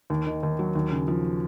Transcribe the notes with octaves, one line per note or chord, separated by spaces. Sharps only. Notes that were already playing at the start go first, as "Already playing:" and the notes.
D#2
D#3
D#2
F#3
D#2
C#3
F3